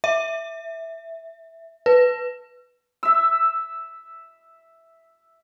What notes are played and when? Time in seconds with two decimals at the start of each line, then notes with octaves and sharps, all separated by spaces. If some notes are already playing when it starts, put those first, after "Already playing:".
0.04 E5
1.86 B4
3.03 E5 E6